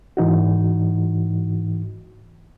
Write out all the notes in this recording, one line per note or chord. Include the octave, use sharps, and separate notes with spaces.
G#2 E3 D#4 F#4